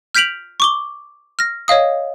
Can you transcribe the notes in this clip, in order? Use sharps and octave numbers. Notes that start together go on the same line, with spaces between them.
F6 G6 B6 D7 F7 F#7
C#6 D6 G7
F6 A#6
C#5 D#5 F5 D#6